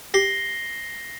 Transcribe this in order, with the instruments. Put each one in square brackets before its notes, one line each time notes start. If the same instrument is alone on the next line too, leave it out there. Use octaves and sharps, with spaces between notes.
[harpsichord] G4 [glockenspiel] A#6 C7 G7